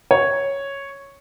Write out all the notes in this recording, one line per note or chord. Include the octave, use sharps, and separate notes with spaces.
C#5